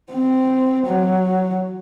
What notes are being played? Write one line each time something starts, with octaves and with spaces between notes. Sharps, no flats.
C4
F#3